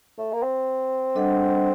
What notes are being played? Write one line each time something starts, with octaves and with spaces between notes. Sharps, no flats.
A3
A#3
C4
G3 D4 A4 D#5 F#5